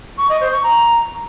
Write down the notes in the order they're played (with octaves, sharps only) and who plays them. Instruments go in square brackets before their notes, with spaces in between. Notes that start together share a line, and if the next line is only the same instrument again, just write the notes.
[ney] C#6
D#5
C5
C#6
A#5